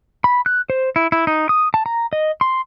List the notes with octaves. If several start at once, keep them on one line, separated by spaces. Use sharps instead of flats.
B5
F#6
C5
E4
E4
D#4
D#6
A5
A#5
D#5
C6